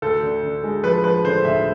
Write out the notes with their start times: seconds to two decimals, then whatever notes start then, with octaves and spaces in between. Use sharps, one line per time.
0.02 D2 A4
0.23 D3
0.43 D3
0.63 G#3
0.84 F3 B4
1.04 F3 B4
1.24 D3 C5
1.45 D2 E5